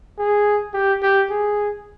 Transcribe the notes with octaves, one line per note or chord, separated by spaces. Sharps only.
G#4
G4
G4
G#4